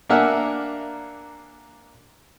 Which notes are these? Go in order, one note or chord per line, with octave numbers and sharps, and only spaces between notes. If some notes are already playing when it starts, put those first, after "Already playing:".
A#3 D4 A#4 E5 F#5 G#5